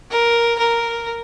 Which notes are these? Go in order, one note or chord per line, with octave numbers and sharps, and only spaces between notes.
A#4
A#4